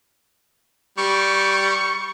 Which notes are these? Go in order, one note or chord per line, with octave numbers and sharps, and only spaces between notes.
G3 C#6